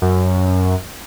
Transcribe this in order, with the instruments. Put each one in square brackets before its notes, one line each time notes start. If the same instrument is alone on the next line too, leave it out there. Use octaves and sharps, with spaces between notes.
[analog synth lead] F#2